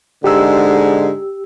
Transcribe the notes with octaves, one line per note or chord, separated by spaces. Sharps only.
G#2 D3 G#3 G4 E6